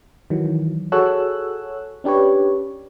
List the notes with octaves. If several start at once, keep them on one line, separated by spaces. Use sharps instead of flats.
D#3 E3 F#3
F#4 G#4 A4 C#5 E6 F#6
C#4 D4 G4 B4 C#5